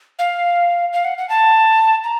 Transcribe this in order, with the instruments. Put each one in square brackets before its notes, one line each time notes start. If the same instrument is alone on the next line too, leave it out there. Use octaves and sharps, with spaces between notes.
[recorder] F5
F5
F#5
F#5
A5
A#5